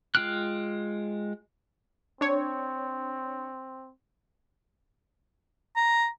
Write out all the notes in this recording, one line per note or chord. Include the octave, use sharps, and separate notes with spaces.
G#3 F4 G5 F6 F#6
C4 D4 C#5
A#5